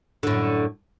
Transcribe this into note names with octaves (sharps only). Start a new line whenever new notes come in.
F#2 A2 D3